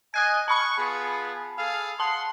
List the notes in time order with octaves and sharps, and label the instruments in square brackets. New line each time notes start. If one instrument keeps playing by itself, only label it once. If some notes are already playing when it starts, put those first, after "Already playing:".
[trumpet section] D#5 G#5 [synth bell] D#6 F#6 G#6
[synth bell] A5 B5 [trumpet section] C#6
[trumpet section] B3 F4 G#4
G#4 A4 F5
[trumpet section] F5 F#5 C6 [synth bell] A5